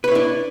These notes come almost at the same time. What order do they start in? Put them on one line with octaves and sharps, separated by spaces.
B4 C#5 E4 D4